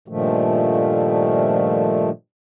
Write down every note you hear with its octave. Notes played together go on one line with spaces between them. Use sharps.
G2 A#2 D#3 F3 A3